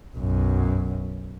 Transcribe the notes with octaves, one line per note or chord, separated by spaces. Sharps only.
B1 F#2